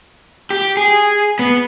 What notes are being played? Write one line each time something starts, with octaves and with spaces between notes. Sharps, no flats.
G4
G#4
B3